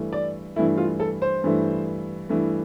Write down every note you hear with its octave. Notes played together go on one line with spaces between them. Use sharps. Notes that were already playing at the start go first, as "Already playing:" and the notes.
Already playing: G2 E3 A3
D5
G2 E3 A3 E4
F4
A4
C5
G2 E3 A3
G2 E3 A3